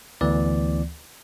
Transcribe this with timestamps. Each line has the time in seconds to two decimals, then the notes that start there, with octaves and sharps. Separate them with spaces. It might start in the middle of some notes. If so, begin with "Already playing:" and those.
0.21 D2 E3 B3 D5